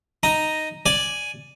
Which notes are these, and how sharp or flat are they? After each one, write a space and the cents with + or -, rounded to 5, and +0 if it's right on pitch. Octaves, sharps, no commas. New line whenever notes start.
D#4 +0 A#5 +0
D5 +0 G#5 +0